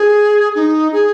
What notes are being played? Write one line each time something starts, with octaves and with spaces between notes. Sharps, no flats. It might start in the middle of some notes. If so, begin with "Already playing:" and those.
Already playing: G#4
D#4
G#4